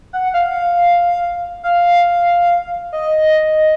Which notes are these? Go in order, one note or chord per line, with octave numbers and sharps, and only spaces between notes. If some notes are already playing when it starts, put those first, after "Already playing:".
F#5
F5
F5
D#5